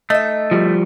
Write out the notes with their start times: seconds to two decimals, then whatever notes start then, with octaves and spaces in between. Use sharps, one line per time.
0.10 A3 D#4 E5
0.51 F3 G3